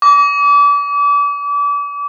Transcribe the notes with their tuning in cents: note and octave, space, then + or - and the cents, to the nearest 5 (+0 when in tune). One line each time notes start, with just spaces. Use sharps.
D6 -35